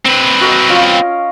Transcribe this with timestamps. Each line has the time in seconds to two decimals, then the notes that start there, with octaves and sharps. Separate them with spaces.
0.05 C4 B4
0.41 F#4 A#4 D#5
0.69 C#4 F4